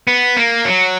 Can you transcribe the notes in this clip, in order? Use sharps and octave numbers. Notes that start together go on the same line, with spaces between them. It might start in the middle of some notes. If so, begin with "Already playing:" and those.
B3
A#3
F#3